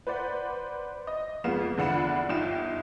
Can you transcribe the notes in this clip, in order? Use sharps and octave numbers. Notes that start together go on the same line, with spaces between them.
B4 C5 D5 F#5
D#5
F2 G#3 B3 F4 E7
E2 D3 F4 F#5 B5 E7
G1 D#4 F4 G5 E7